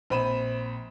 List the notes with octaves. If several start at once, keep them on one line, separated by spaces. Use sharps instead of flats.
A#1 C4 B5 D#7 E7